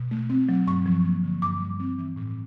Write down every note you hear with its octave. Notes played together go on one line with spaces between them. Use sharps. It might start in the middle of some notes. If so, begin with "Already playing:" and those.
Already playing: B2
A3
C4
F#3
G2 C#6
F3
A#3
D3
G2 D6
G3
C4
E3
A2